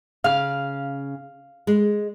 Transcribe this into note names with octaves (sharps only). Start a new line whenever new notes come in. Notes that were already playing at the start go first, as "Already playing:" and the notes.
C#3 F5 F6
G#3